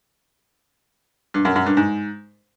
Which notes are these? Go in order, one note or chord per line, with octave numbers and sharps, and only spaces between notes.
G2
F#2
F#2
G2
G#2